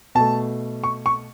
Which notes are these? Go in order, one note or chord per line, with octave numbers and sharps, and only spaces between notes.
B2 A3 A5
C#6
C#6